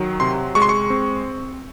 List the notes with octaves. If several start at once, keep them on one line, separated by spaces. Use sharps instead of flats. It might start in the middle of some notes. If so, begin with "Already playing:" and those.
Already playing: D#3 F#3
C3 C6
G#3 C#6
C6
C#6
C4